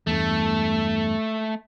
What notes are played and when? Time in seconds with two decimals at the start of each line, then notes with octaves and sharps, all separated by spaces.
0.07 E2 G2 A3